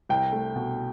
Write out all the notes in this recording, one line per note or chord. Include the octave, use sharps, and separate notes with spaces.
C2 G5
A3
B2